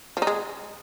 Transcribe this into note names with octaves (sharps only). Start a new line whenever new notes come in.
F3
D#4
G#3